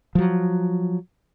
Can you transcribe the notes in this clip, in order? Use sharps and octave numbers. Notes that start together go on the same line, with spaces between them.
F3 F#3